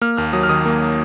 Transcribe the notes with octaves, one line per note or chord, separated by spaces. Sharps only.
A#3 F6
D#2 F6
F#3 D#6
F6
D#3 D#6
A#3